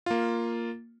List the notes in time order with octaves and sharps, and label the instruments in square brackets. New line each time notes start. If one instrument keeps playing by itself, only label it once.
[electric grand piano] A#3 F4